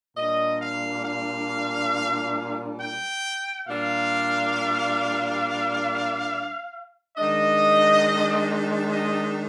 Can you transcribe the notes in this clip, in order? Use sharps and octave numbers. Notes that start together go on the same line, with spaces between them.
A#2 G3 D4 D#5
F5
F5
G5
A#2 G3 D4 F5
D#3 G#3 D4 D#5
D#5